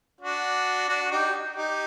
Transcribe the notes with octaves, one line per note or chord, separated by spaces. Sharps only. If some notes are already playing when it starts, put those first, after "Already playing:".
D4 F#4
D4 F#4
D#4 G4
D#4 G4